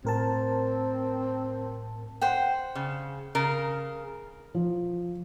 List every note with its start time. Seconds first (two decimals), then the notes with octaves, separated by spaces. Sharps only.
0.05 A2 C4 A#4 A5
2.21 C5 F#5 G5
2.75 C#3
3.35 C#3 A#4
4.54 F3